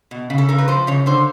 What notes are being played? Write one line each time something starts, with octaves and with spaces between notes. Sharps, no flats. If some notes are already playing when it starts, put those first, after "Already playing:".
B2
C#3
A4
C#3 A#4
B4
F3 C5
C#3 C#5
D3 C5